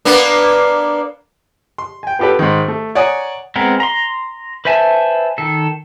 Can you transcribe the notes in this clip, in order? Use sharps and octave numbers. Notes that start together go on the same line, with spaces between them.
A#3 B3 D4
C6
G5 G#5
B3 F4 G4 A4 B4
G#2 D#3
A3
C#5 D5 F#5 G#5 A#5 D#6
G#3 B3 C4 A#4
A#5 C6
B4 C5 E5 G#5 A5
D#3 A4